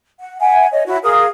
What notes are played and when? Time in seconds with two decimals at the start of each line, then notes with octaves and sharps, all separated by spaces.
0.19 F#5
0.40 E5 F#5 G#5
0.73 C#5 D#5
0.86 E4 F#4 C#5
1.04 G#4 A#4 F5 D#6